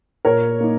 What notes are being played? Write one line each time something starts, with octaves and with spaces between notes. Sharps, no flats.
A#2 A#4 C#5
A#3 D#4